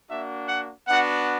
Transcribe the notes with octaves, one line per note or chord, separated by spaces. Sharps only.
A#3 D4 F#4 E5
F#5
B3 D4 F#4 F#5